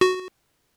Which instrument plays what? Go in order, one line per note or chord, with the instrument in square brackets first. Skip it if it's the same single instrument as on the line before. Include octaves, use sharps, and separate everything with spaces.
[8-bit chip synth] F#4